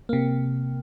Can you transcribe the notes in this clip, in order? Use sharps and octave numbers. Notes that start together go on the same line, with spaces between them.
C3 A#3